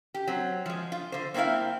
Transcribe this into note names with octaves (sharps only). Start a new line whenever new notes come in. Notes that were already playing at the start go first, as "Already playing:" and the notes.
G4
F#3 C4
F3 G#3
F4
D3 C5
A#3 C4 C#4 E4 F5